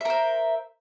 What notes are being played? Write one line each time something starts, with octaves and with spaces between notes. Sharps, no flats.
A#4 C5 E5